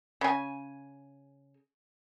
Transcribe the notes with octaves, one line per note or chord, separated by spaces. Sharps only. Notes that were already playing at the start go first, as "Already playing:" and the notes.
C#3 G#5